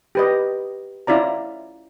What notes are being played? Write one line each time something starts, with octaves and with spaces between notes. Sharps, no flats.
G4 B4 D#5
C#4 E4 F4 D5 A#5